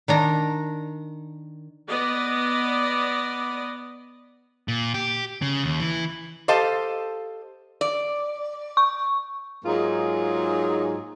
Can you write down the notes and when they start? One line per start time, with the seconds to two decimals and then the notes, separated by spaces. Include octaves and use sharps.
0.08 D#3 D4 A#5
1.89 B3 D5 D#5
4.68 A#2
4.94 G4
5.42 C#3
5.64 D#2
5.80 E3
6.48 G4 A4 C5 D#5 F5 A5
7.81 D5
8.77 C#6
9.65 G#2 F#3 A#3 D#4 F4 G#4